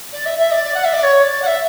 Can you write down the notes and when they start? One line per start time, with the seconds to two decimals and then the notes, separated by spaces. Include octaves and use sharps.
0.12 D5
0.26 E5
0.38 E5
0.51 D5
0.64 D5
0.74 F#5
0.84 E5
0.93 D5
1.03 C#5
1.22 D5
1.42 F#5
1.46 E5